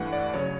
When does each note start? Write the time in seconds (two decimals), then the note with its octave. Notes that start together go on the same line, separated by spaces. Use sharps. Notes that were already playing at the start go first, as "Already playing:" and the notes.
Already playing: G2 E3 A3 F#5
0.13 D5
0.34 C#3 F#3 C#5